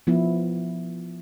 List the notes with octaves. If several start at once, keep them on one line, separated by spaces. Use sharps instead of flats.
F3 B3 E4